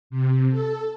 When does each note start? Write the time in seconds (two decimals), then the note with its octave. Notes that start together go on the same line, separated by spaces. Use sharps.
0.10 C3
0.50 A4